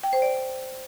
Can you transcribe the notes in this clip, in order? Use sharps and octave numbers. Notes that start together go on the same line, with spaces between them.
G5
C5
D5